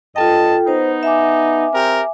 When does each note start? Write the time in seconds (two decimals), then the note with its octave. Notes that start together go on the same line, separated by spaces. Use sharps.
0.16 G2 F4 A4 D#5 G5 A5
0.67 B3 D#4 C5
1.03 E5 G#5 D6
1.74 C4 G4 A#4